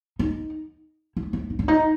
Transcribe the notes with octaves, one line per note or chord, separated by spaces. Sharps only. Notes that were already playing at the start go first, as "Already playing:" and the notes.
D#4
E4
E4
D#4
D4
D#4